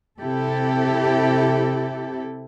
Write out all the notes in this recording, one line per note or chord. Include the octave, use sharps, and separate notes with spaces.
C3 E4 G4 A4